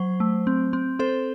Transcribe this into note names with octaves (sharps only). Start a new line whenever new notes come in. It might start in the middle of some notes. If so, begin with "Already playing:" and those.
Already playing: F#3 C5
A3
C4
C4
C4 A4 C5